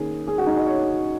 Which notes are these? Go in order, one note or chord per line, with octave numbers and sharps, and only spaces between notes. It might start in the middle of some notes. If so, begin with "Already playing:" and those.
Already playing: D#3 A#3 C#4 G#4
G#4
F#4
D#4
D#5
C#5